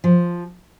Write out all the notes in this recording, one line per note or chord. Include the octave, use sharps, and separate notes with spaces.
F3